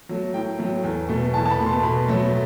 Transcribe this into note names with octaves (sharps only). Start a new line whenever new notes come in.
F#3 A3
A2 G5
F#3 A3
E2
B2 A3
E2 A5
A5
B5
B2 A3
C6
B2 B5
F#3 A3